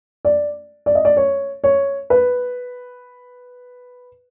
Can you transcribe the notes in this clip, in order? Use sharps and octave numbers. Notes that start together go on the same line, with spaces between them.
D5
D5
D#5
D5
C#5
C#5
B4